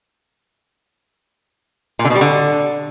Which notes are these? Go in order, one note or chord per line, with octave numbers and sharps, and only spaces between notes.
A#2
D3
B2
G3
D3